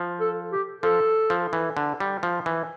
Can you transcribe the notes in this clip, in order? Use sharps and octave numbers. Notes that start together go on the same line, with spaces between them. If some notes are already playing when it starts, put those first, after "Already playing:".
Already playing: F3
A4
G4
F3 A4
F3
E3
D3
G3
F3
E3